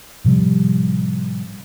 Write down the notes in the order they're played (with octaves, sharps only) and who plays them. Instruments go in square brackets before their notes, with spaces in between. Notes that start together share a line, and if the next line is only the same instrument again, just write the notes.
[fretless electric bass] A2 C3 F3 G3